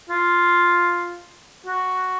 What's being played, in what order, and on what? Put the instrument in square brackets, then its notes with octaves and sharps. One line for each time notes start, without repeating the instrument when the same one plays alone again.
[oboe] F4
F#4